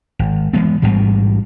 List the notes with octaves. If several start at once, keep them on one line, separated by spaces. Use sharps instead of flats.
G#1
E3 G#3 B3
A1 G#2 B2 G3